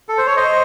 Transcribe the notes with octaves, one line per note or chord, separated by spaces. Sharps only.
A4
C5
C#5
C5 D#5